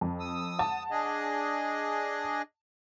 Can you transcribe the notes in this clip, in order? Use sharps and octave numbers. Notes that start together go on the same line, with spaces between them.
F2
D#6 E6
F#5 A5
D4 G#4 D#5